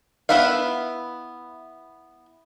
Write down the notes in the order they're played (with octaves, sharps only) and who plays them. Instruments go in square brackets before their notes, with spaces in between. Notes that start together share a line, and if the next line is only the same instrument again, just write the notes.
[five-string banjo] B3 E4 B4 E5 F5